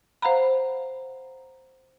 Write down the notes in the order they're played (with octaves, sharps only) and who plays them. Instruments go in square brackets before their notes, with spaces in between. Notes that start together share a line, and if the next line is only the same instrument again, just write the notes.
[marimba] C5 F5 F#5 A#5 B5